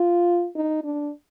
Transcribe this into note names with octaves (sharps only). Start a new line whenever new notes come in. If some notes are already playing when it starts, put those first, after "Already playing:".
Already playing: F4
D#4
D4